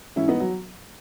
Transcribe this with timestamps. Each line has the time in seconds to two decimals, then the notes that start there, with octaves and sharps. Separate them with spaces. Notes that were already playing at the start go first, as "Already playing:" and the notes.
0.16 G#2 E3 C#4 E4
0.28 B3 D#4
0.40 F#3